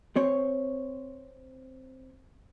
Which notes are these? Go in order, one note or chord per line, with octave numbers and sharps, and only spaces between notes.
C4 C5 C#5